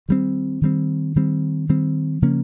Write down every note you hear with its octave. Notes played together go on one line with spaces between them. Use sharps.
D#3 G3 C4
D#3 G3 C4
D#3 G3 C4
D#3 G3 C4
C#3 F3 A#3 C#4